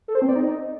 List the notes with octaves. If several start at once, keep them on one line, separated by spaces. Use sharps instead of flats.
A4
C5
C4
D5
D#4